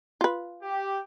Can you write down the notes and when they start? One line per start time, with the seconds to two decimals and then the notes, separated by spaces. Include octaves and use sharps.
0.21 F4 B4
0.62 G4